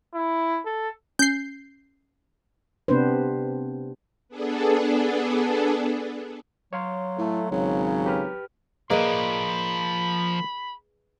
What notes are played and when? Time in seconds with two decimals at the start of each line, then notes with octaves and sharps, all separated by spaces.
0.14 E4
0.66 A4
1.19 C#4 G6 C7
2.88 C3 B3 C4 D4 B4 C5
4.29 B3 D4 G#4 A4
6.73 F#3 C#5 F5 C6
7.18 A2 A3
7.51 G#1 C#3 F#3
8.06 G4 B4 F6
8.90 F3 A#3 G#4 B4 D5 D#5 B5